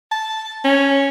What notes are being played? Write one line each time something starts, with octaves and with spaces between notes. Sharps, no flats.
A5
C#4